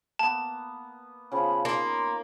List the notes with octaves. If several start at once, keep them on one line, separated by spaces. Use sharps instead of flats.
A#3 B3 A5
C#3 F3 B3 B5
A#3 D#4 C6